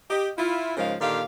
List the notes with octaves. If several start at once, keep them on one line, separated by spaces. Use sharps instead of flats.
G4 D#5
E4 F4
G#2 C#3 F3 G#3 A#4 F5
A#2 D3 D#3 G4 F5